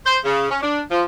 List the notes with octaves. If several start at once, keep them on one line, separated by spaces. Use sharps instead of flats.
C5
C#3
C#4
D4
F3